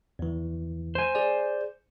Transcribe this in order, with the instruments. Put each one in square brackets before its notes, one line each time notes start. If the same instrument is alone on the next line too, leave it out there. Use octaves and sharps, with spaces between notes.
[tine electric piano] E2 E3
[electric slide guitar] C5 G#5
[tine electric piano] G#4 D5